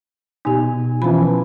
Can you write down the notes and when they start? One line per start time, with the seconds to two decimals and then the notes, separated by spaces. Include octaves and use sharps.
0.45 B2 D#4 G4 G#5
1.02 E3 F3 C#4 B5